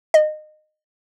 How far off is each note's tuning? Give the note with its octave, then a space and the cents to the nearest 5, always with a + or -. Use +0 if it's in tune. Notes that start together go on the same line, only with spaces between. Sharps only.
D#5 -20